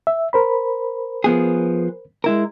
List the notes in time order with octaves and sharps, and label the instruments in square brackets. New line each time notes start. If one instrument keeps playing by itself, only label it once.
[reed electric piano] E5
A#4 C5 B5
[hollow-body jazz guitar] F3 B3 G#4
G#3 E4 A#4